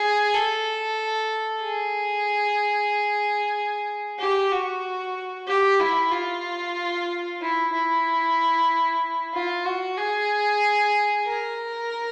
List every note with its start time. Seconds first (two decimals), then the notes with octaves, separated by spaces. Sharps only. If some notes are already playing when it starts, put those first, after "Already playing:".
Already playing: G#4
0.34 A4
1.62 G#4
4.19 G4
4.52 F#4
5.48 G4
5.80 E4
6.12 F4
7.41 E4
7.73 E4
9.34 F4
9.65 F#4
9.98 G#4
11.26 A#4